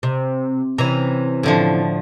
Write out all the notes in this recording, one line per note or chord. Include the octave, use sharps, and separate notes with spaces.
C3
C3 E3 C#4 A#5
A2 D3 F3